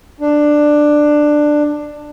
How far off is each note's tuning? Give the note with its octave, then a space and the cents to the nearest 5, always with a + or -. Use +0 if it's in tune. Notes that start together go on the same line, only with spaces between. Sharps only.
D4 +10